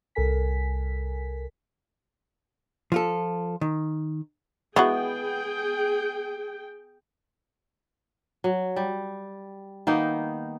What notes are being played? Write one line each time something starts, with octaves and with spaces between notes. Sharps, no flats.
C2 A4 A#4 G#5 B6
F3 F4 A4
D#3
E3 G#3 B3 F#4 G#4 G5
F#3
G3
D#3 A#3 B3 D#4